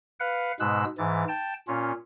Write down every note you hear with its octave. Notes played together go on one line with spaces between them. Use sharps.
B4 F5 F#5
G#2 B2 G#3 E6 F#6
G#2 E3 A6
G5 A5
A#2 C#4 F4